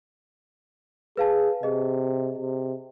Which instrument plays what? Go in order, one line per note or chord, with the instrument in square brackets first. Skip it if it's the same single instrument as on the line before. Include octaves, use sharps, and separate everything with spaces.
[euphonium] G#4 [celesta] B4 F5 A5
[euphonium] C3 [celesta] G#4 D#5
[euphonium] C3